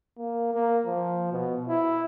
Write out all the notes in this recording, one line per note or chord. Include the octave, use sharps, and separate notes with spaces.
A#3
A#3
F3
B2
E4